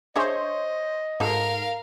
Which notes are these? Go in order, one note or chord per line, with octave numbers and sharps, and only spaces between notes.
D4 G#4 C5 C#5 D#5 E5
G#2 D#4 F#4 A4 A#4 F5